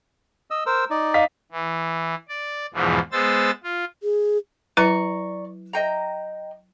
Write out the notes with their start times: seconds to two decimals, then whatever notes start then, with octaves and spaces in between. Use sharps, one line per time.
0.50 D#5 E6
0.66 A#4 C5 E6
0.90 D#4 D5
1.14 D#5 F5 B6
1.52 E3
2.28 D5
2.74 E2 G#2 B2 E3 F3
3.12 G#3 B3 C5 E6 A6
3.64 F4
4.02 G#4
4.77 F#3 E4 B4 D5 A#5 C#6
5.73 D#5 G5 A#5